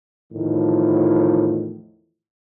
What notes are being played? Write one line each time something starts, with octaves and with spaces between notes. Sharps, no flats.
E2 A2 D#3 F3